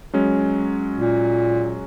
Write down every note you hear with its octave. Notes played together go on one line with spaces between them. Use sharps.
F#3 G#3 C#4
A#2